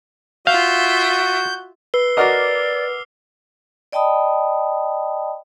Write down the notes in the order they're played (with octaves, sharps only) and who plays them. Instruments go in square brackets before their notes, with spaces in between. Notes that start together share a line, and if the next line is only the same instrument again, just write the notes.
[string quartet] F4 E5 [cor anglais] F#4 [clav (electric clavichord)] F5 [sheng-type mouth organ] G6
[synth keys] B4 [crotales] E6 C7 G7
[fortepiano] F#4 A#4 D#5 [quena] D5 [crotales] D6 F6 C7
[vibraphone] D5 D#5 G5 A5 B5 D#6